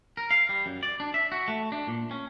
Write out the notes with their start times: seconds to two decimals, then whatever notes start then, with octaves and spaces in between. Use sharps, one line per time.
0.17 A#4
0.31 F5
0.49 G3
0.66 F#2
0.83 D5
1.00 D4
1.14 E5
1.32 F#4
1.48 A3
1.72 D4
1.88 A#2
2.11 C#4